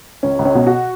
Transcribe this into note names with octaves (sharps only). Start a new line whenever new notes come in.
C#2 C#4
C#2
C#4
B2
F#4